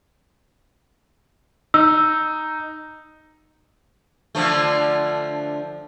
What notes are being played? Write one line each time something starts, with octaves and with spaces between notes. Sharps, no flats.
D#4 E6
D3 F3 A3